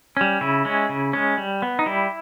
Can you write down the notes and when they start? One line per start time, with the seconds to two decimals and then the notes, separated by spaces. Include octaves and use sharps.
0.17 G3 C#4
0.41 C#3 E4
0.65 G#3 C#4
0.89 C#3
1.13 G#3 C#4
1.38 G3
1.62 B3
1.79 D#4
1.86 G3 E4